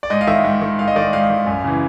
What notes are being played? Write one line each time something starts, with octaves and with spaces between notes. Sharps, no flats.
D5
G#2 D#5
F5
D#3 E5
G#2
D#3
G#2 F5
D#5
D#3 D5
G#2 F5
D#3
F#2
C#3 E3